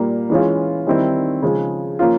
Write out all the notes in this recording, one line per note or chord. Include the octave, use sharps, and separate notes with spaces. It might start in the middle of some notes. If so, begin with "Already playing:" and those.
Already playing: A#2 G3 A#3
E3 G#3 C#4 F4
D#3 G3 C4 E4
C#3 F3 G#3
F3 A#3 C#4 F4